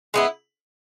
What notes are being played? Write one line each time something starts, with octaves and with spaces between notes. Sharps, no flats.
G#3 B3 E4